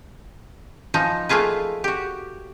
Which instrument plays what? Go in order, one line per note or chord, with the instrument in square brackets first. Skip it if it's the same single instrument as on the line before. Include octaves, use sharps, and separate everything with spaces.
[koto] E3 F3 D#4
A3 A#3 F4 G#4 B4
F#4 G4